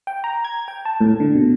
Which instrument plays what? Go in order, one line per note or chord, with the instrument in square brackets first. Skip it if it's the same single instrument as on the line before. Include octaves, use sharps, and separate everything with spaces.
[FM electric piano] G5
A#5
G#6
G5
A5
A2
D3
B2